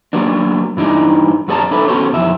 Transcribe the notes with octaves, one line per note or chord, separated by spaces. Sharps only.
F#3 A#3 B3 D4
G2 E3 D4 D#4
F#2 B3 G#4 D5 A5 A#5
D4 E4 A4 B4
B3 C#4 F#4 A4 C5 C#5
B1 F2 E3 E5